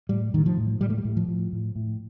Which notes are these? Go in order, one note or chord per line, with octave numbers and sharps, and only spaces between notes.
A2 G3
A2 D#3
F3
A2
A2 G3
A3
G3
A2
F3
A2
A2
A2